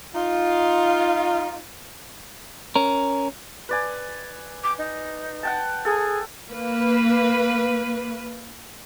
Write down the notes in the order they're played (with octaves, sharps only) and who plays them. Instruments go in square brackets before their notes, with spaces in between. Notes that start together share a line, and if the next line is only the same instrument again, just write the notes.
[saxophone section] D#4 F4
[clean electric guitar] C#4 A#4
[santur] B4 D5 G#5
[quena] D6
D#4
[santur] F#5 G5 A5
[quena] G#4 [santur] A4
[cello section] A#3 B4